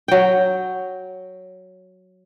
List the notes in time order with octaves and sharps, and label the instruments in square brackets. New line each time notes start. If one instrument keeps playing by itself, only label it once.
[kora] F#3 G5